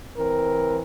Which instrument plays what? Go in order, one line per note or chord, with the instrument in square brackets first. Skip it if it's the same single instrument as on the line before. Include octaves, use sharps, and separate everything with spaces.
[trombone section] E3 C4 A#4